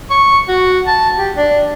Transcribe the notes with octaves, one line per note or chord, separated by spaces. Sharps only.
C#6
F#4
A5
G4
D4